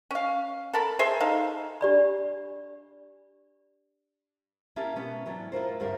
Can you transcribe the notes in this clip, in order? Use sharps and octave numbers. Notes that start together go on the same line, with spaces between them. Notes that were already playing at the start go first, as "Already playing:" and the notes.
C#4 F5
A4 A#4 A5 B5
G#4 C5 E5
D#4 A4 F5
D4 G4 D5 B5
A#3 C#4 E4 G4 E5 A5
B2 B3 C#4
E3 F#3 D4
E4 F4 A#4 C5
D2 G2 G3 A#3 B3 A#4